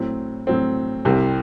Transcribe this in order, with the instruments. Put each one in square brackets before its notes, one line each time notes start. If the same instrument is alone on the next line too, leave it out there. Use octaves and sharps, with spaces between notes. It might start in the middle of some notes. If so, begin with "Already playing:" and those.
Already playing: [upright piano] A2 F#3 C4
A2 F#3 C4
C2 C3 G3